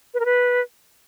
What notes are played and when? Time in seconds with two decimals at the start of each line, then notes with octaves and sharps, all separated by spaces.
0.14 B4
0.20 A#4
0.25 B4